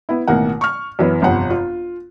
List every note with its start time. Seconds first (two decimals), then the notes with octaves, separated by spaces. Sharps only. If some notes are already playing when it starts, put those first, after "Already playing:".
0.09 B3 E4
0.27 A1 B2 D#3 A#3 F#5
0.61 C#6 F6
0.99 F#2 E3 B3
1.22 G1 F2 C3 F#5
1.50 F4